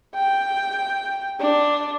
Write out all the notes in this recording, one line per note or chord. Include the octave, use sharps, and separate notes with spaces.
G5
D4